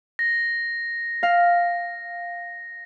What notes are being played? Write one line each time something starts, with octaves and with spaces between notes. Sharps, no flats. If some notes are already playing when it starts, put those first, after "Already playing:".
A#6
F5